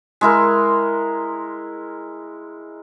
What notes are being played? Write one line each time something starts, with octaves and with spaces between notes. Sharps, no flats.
G#3 E4 A#4